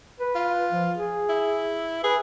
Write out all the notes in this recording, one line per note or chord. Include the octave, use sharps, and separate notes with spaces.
B4
F4
F3
G#4
E4
G#4 B4